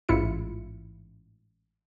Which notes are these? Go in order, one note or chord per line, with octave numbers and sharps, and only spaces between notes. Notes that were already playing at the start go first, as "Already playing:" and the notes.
A1 G#2 E4 F4 C#7